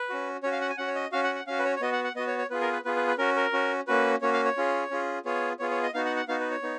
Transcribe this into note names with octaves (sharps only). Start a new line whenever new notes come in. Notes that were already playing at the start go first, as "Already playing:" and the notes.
Already playing: B4
C#4 F#4
C#4 F#4 C#5
F5
F#5
G#5
C#4 F#4 F#5
C#5
D#5
C#4 F#4 F5
F#5
F#5
C#4 F#4 F5
B4
C#5
C#5
B3 F#4 D#5
F#5
F#5
B3 F#4 D#5
C#5
C#5
B3 F4 G#4 B4
A#4
B4
B3 F4 G#4 B4
B4
B4
C#4 F#4 A#4
A#4
C#4 F#4
A#3 C#4 F#4 B4
A#3 C#4 F#4 C#5
F5
C#5
C#4 F4 G#4
C#4 F4 G#4
B3 F4 G#4 C#5
B3 F4 G#4 C#5
C#5
D#5
B3 D#4 F#4 F5
F#5
F#5
B3 D#4 F#4 F5
B4
C#5
B3 D#4